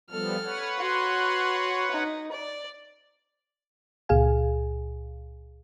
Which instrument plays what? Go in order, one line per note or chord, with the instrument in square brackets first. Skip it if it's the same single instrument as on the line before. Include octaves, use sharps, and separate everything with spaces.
[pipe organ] F3 G3 B3 [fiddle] A4 F6
[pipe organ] B4 C#5 F#5
[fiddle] F#4 C6
D#4
D5
[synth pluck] C#2 A#2 G#4 F5 G#5